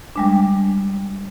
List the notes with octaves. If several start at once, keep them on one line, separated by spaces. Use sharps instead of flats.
G3 G#3 D4